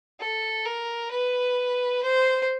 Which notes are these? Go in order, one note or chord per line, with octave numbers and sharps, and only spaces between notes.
A4
A#4
B4
C5